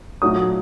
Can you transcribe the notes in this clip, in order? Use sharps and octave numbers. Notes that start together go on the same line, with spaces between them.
A#2 F#3 A3 D#4 F#4 D#6